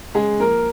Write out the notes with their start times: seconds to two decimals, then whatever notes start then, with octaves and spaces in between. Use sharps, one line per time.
0.15 C#3 G#3 G#4
0.40 F3 A#3 A#4